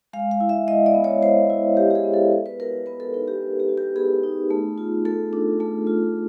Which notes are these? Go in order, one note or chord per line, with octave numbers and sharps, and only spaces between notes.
G#3 F5
F5
E4
E5
G#3 D#5
D5
B3
C#5
G#3 C5
E4
G#3 G4
G4
G#4
B3
A4
B3 A#4
B4
F#4 A#4
B3 B4
A4
D#4 A4
G4
B3
G4
F#4
G4
B3 G#4
D#4
A3
F4
A3 A4
D4
A3
F4